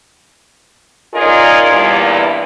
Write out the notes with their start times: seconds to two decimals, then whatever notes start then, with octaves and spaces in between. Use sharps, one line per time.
1.14 C#4 D#4 F4 G#4 A#4 D5
1.72 E2 G2 A#2